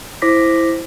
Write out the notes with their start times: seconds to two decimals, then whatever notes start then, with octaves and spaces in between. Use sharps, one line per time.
0.22 E4 C5 D6 A#6 B6